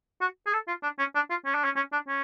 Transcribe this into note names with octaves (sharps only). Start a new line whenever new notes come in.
F#4
G#4
A4
F4
D4
C#4
D4
F4
C#4
D4
C#4
C#4
D4
C#4